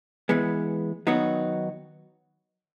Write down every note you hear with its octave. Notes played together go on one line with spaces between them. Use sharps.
E3 G#3 B3
D#3 F#3 B3 D#4 F#4